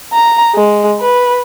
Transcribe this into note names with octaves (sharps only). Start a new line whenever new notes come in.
A#5
G#3
B4